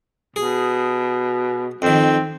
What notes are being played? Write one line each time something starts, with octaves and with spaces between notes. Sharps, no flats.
B2 G#4
F2 D#3 C4